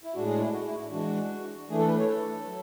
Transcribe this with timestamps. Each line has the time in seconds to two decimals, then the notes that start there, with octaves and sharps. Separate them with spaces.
0.04 E4
0.15 A2 G#3 D4 F#4
0.27 G#4
0.40 E4
0.53 F#4
0.66 E4
0.79 E4
0.91 E3 G#3 D4 F#4
1.70 E3 A3 D4 G#4
1.79 A4
1.88 B4
1.98 C#5
2.08 A4
2.47 F#3